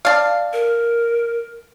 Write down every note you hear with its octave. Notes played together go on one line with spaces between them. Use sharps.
D4 F5
A#4